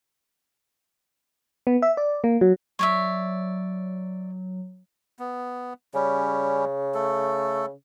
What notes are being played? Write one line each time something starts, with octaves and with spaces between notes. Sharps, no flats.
B3
E5
D5
A#3
F#3
F#3 C#5 D5 E5
B3
C#3 G3 C#4
A3 A4